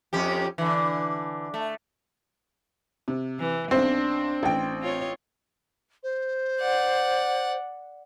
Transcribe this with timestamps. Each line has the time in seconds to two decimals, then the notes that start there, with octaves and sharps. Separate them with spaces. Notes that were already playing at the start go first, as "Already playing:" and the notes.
0.13 F2 C#4 G4
0.58 D3 E3
1.54 A3
3.08 C3
3.39 E3
3.71 B1 C4 D4 C5
4.43 A1 G5
4.82 F4 C#5
6.03 C5
6.60 D5 F#5